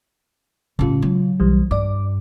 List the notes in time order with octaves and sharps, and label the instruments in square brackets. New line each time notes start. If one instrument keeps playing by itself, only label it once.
[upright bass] A1 G3 [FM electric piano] C#3 F4
[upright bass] F#3
[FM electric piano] B1 E3 G3
[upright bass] G2 [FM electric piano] D5 D6